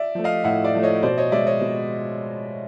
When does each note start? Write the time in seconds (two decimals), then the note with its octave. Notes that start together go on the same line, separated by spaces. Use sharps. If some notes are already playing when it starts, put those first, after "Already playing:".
Already playing: D5 E5
0.15 F3 A3
0.24 D#5 F5
0.44 A2 E5 F#5
0.64 D5 E5
0.74 F3 A3
0.83 C#5 D#5
1.02 B2 C5 D5
1.18 C#5 D#5
1.32 G#3 D5 E5
1.47 C#5 D#5
1.61 B2